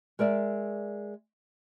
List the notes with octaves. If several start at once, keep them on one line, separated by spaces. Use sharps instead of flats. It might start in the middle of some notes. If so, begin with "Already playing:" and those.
G#3 A#4 D5 E5